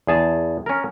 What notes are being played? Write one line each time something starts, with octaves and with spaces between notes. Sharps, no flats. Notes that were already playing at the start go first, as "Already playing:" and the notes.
E2 G#4 A5
C#4 A#4